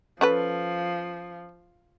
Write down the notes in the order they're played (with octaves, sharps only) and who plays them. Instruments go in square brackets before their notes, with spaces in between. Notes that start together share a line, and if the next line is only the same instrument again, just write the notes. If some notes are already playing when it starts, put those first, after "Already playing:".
[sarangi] F3 [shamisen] C#4 A4 B4